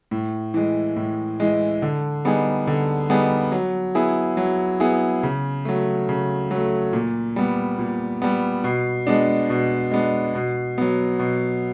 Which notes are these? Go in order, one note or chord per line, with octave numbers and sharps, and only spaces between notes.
A2
E3 G#3
A2
E3 G#3
D3
G3 B3 D#4 G#4
D3
G3 B3 D#4 G#4
F#3
B3 E4 G#4
F#3
B3 E4 G#4
C#3
F#3 A3
C#3
F#3 A3
A#2
G3 B3
A#2
G3 B3
B2
G#3 B3 D4
B2
G#3 B3 D4
B2
F#3 B3
B2